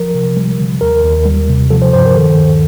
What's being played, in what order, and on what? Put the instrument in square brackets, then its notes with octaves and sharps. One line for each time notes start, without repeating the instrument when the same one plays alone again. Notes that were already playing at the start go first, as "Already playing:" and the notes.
Already playing: [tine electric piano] F3 A#4
C3
G3
D3
D#2 A#4
D#2
G3
C3
F3 A4
C5
G2 C5
A#4
D#3 A4
D#2